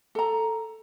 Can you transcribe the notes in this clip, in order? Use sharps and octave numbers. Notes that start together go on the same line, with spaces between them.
A4 A#5